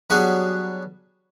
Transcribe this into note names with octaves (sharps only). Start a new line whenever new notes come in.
F#3 G3 B3 D4 F#4 G#4